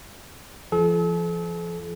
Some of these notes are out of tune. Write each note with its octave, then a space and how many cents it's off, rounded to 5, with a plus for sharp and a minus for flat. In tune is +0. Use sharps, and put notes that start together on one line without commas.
F3 -35 A4 -40